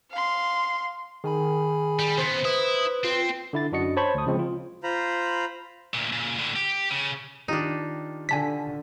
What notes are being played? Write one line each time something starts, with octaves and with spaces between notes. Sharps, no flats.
F5 C6
D#3 G#4 G#5 B5
G3
C#3 B3 C5
E4 B4 D#6
C4 F4
D3 E4 A6
F#2 D4 F#4 D#5 C#7
C5 C#5 A5 B5 C#6
D2 D#6
C#3 F3 G#3 C4
F4
F4 C5 A#5 B5
D2 A#2
A#2 C#3
A2 D3
G4
C#3
D#3 D4 D#4 F4 G4
D3 G#5 A5 B6